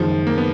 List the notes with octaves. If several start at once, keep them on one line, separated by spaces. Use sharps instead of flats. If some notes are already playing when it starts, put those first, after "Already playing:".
Already playing: F#1 F#2 D#3 F3 G#3
A#3
B3